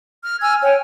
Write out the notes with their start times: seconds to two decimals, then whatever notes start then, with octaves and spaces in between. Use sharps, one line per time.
0.23 F6
0.41 G#5 E6 F6 G#6
0.62 C#5 G5 G#5